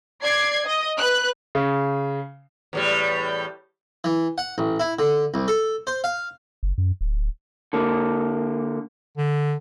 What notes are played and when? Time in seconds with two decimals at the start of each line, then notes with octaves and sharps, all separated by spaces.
0.23 D5 G#6 C7
0.65 D#5
0.99 B4 F#6
1.55 C#3
2.73 E2 A2 G3
4.04 E3
4.38 F#5
4.58 A1
4.80 E4
4.99 D3
5.34 C2
5.48 A4
5.87 C5
6.04 F5
6.63 F#1
6.78 F#2
7.01 D1
7.73 D3 A#3
9.17 D3